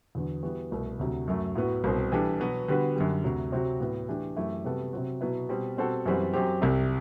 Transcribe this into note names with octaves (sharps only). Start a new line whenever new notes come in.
E2 D3 F#3 B3
E3 G3 B3 F#4
C2 B2 A3
D2 C3 F#3
F#2 F#3 A3
A2 F#3 B3 F#4
C2 B2 F#3 C4
E3 G3 D4 A4
B2 F#3 B3
D3 G3 B3 F#4 B4
F#2 D3 G3
D2 C3 F#3
C3 F#3 C4 F#4
A2 F#3 B3
E3 A3 D4 G4
F#2 E3 A3 E4 G4
C3 G3 B3 F#4 A4
C3 F#3 C4 F#4
B2 F#3 B3 E4
B2 G3 C4
B2 G3 C4 F#4 A4
F#2 E3 G3 C4 F#4
F#2 F#3 C4 G4
C2 C3 G3